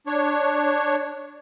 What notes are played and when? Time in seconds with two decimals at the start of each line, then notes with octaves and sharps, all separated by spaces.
0.07 D4 C#5